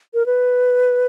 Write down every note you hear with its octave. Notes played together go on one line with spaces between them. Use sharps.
A#4
B4